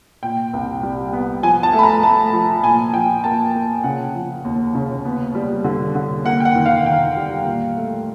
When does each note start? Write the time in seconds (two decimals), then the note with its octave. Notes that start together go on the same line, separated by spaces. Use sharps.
0.23 A#2 G5
0.53 C2
0.83 G3
1.13 B3
1.43 F3 G#5
1.63 A5
1.73 A3
1.79 B5
1.83 A#5
2.03 A3 A5
2.33 F3
2.63 A#2 G#5
2.93 F3 G5
3.24 A#3 A5
3.55 A#3
3.84 C#3 F#5
4.14 F3
4.45 D#2
4.75 C#3
5.05 B3
5.35 G3
5.64 D3
5.95 D3
6.25 A#3 F#5
6.40 G5
6.45 F#5
6.55 D#3
6.66 F5
6.85 D#3 G5
7.16 G3
7.45 A#2
7.76 A3